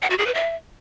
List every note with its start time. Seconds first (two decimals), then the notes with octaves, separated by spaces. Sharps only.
0.02 F#5
0.10 F#4
0.18 G#4
0.26 B4
0.34 E5